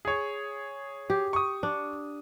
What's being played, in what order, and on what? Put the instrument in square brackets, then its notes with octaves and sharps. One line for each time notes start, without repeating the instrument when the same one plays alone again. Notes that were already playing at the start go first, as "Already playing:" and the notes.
[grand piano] G#4 C#5
[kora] G4
[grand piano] C#6 D#6
[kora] D4